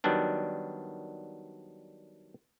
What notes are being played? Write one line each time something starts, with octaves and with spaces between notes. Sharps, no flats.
D#3 F#3 G3 B3 D4